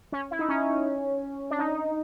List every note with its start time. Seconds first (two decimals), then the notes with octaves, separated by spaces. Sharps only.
0.12 C#4
0.31 E4
0.39 D#4
0.49 C#4
1.50 D4
1.59 D#4